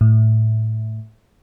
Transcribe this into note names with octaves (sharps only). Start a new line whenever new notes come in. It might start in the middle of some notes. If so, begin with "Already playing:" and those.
A2